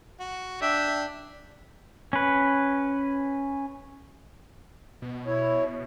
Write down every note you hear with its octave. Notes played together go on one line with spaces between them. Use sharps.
F#4
D4 E5 G5
C#4 B4
B2
E4 C#5